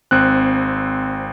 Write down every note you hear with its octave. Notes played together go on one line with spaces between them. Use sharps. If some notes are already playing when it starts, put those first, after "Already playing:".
G#1 C4 F#6